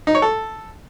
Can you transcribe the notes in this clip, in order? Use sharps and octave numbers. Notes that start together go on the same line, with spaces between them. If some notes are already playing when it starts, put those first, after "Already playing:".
D#4
C#5
A4